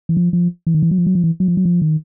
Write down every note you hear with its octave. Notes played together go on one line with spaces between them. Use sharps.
E3
F3
F3
E3
D#3
E3
F#3
F3
F#3
F3
E3
F#3
F3
F#3
F3
D#3